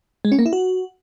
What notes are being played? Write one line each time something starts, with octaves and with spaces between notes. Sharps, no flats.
G#3
C#4
A#3
E4
F#4